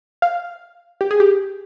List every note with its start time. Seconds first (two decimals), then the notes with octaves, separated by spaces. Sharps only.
0.22 F5
1.01 G4
1.11 G#4
1.20 G4